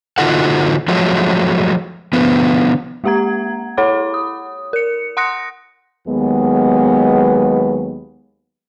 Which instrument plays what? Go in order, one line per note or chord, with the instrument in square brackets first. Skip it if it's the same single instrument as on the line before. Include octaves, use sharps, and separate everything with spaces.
[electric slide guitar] D3 D#4 F4 F#4 A4 F#5
F3 F#3 G#3 A3
D3 F3 B3
[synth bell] G#3 A#3 G4 F#5 A#5 G#6
E4 A4 C#5 F#5 B5 D6
D#6
A#4 C#7
F#5 C6 D#6 F#6 A#6 C#7
[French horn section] D#2 F#3 G#3 B3